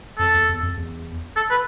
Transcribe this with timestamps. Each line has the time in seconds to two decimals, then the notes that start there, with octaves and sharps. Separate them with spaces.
0.18 F2 A4
0.34 E2
0.49 E2
0.63 F2
0.77 E2
1.36 A4
1.50 B4